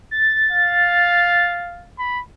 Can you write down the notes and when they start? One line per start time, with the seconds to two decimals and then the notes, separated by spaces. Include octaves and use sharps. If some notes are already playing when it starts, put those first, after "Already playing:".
0.11 A6
0.51 F5
1.99 B5